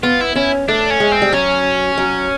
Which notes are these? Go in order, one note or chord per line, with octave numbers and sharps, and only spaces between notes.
B3 F4
E4
C#4 E4
A3 D4
C#4
G#3
C4
G3
F#3 C#4
F#3